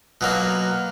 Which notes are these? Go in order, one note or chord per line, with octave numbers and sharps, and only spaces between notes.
B2 F#3 A#3